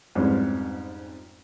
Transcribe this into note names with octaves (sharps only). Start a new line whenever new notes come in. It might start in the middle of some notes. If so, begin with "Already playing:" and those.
F2 G#2 E3 G3 G#3 C#4